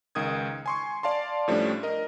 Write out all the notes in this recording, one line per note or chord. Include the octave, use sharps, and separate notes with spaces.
C#2 D#3 D#6 G#6
G#5 C6 C#6
D5 F5 A5 C6
A2 F3 G3 A3 C#4 D4
A#4 D#5